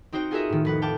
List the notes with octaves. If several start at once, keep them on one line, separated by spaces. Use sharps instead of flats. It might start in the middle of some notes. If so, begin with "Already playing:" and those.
C4 D#4 F#4 C5 G5
F4 F#4 G#4 A#4 D#5 E5
A2 D#3
F1 B4 F#5
F5 G5 A5 D6